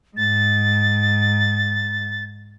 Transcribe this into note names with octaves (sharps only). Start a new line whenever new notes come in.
G#2 A6